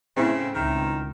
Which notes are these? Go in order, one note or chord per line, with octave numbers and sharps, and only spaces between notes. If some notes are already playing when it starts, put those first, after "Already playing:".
A2 C#3 C4 E4
C#2 D#3